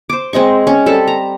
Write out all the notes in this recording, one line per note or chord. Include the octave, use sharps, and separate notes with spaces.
C5 D6
G#3 C4 D#5 C#6
C#4
G3 C4 A4
A#5